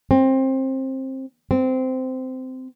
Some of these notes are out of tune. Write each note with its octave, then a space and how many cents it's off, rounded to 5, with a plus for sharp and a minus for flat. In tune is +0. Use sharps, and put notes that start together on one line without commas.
C4 +20
C4 -15